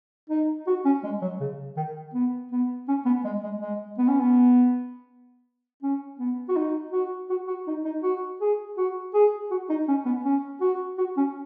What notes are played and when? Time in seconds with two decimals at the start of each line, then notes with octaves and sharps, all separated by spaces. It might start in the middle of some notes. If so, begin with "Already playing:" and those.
0.30 D#4
0.67 F#4
0.85 C#4
1.03 G#3
1.22 F#3
1.40 C#3
1.76 D#3
2.14 B3
2.51 B3
2.88 C#4
3.05 B3
3.24 G#3
3.43 G#3
3.61 G#3
3.98 B3
4.08 C#4
4.19 B3
5.83 C#4
6.19 B3
6.49 F#4
6.56 D#4
6.92 F#4
7.30 F#4
7.47 F#4
7.67 D#4
7.85 D#4
8.03 F#4
8.41 G#4
8.77 F#4
9.14 G#4
9.51 F#4
9.69 D#4
9.88 C#4
10.05 B3
10.24 C#4
10.61 F#4
10.98 F#4
11.17 C#4